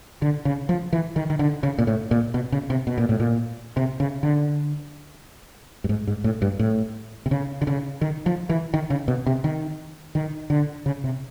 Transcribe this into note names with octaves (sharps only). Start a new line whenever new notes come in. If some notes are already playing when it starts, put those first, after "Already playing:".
D3
C#3
F3
E3
D#3
D#3
D3
C#3
A#2
A2
A#2
B2
C#3
C3
B2
A#2
A2
A#2
C3
C#3
D3
G2
G#2
G#2
A2
G2
A2
C3
C#3
D3
C#3
D#3
F3
E3
D#3
C#3
B2
C3
D#3
D#3
D3
C#3
C3